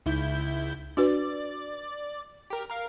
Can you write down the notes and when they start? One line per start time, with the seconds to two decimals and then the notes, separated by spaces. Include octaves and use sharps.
0.06 C#2 D#4 E4 G6
0.97 D4 F#4 B4 D5
2.50 G4 A#4
2.69 A#4 F5